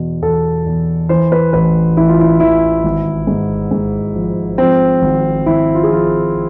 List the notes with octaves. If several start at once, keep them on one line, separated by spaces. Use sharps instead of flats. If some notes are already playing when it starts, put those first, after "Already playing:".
Already playing: E2 B2
E2 A4
E2
E3 C5
B4
A1 B4
A1 E4
F4
E4
E3 E4
G#1
G#2
G#2
F3
F3 C4
G#1
G#1 E4
F4
G#4
F3 F4